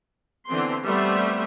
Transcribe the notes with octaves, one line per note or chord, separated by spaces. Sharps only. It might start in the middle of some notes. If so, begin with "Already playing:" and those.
D3 E3 B3 C4 C6
G3 A3 B3 C4 C5 E5